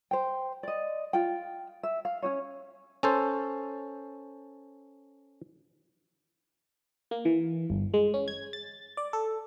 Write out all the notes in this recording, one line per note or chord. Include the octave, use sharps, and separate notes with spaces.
C5 G5
D5 D#5
F4 G5
E5
F5
C#4 F#4 C#5
C#4 A4 C5
A#3
E3
G1
G#3
C#4
G#6
A6
D5
A4